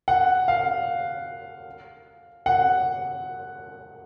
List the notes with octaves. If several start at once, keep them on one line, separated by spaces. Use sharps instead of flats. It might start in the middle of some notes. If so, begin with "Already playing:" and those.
F#5
F5
F#5